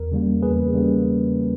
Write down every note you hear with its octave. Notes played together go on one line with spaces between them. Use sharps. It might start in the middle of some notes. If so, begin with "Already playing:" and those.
Already playing: E2 A#4
C#3 G3 A#3
E2 G#4 B4
C#3 G3 A#3